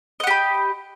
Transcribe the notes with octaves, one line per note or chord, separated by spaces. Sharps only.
G4 D#5 F#5 B5